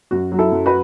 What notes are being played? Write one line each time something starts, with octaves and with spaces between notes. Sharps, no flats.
F#2 F#4
F#3
E4 A4
F#2
F#4 B4